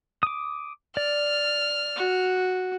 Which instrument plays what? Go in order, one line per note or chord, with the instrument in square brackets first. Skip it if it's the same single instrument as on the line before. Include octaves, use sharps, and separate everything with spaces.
[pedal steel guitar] D6 D#6
[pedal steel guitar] D5 [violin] F6
[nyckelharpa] F#4